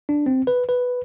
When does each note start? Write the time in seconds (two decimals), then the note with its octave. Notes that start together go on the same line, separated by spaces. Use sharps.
0.09 D4
0.26 C4
0.47 B4
0.69 B4